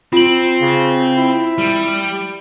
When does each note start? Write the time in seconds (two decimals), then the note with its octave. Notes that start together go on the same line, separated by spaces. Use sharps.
0.13 C4 F4 F#7
0.61 C#3
1.17 E4
1.58 G3